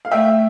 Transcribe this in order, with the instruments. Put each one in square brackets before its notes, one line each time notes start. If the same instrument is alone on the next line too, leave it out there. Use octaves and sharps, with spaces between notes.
[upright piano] F5
[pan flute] A3 [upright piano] E5 G5